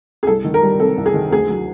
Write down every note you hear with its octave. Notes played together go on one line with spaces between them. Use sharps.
G#4
C2 A4
D#3
A#4
G3
C3 A4
C2
G#4
D#3
D2 G#4
F#3